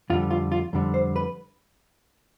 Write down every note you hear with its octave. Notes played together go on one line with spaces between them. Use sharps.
F2 D3 G3 F4
F4
F4
F2 D3 G3
C5
B4